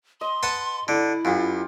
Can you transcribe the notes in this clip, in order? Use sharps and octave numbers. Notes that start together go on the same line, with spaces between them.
D#5 C6
B4 F#5 A5
D3 E4
F#2 F4 G4